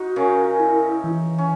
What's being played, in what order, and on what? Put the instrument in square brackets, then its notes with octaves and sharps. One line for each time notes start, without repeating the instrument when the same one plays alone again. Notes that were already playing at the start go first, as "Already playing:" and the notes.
Already playing: [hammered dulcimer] D#4 [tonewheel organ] F#4
[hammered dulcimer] C#3 C#4 [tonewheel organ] A#4
[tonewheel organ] E4
E3
[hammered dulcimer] C#4